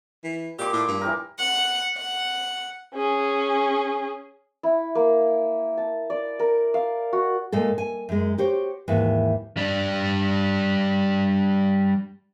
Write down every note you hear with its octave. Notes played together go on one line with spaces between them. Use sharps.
E3
A#2 G4 D6
A2
G2
E3 G4 A#4
F#5
F#5
C#4 G#4
E4
A#3
A5
D5
A#4
F5
F#4
A#2 G#3 A4
G#5
F#2 G#3
F#4 G4 C5 C#5
D#2 G#2 E3
G3 D4